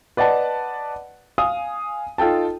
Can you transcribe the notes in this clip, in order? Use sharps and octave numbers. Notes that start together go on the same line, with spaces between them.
B4 D5 D#5 F#5 A5
F5 G#5 D#6
D#4 F4 A4 G5 A5